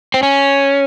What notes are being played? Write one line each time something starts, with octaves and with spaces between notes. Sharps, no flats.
C4
C#4